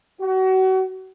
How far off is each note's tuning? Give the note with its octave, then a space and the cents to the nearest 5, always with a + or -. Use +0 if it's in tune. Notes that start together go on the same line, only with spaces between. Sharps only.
F#4 +30